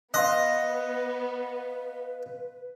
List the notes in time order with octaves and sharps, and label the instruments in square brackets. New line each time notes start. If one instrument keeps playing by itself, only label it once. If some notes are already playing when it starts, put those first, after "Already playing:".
[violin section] B3 [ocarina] B4 [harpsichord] D#5 [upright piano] F5 C6 F#6